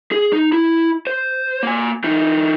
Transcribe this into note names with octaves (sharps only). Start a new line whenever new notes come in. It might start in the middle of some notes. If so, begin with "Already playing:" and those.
G#4
D#4
E4
C5
A#3 G#5
E3 D#4